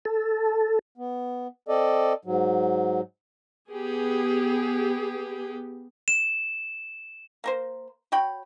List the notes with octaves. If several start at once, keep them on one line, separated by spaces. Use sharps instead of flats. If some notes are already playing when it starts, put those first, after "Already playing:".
A4
B3
C4 A4 D5 D#5
G#2 F#3
B3 G4 G#4
E7
A#3 A#4 C5
F#4 C#5 G5 B5